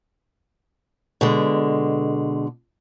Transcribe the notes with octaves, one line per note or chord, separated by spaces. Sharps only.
B2 D3 G#3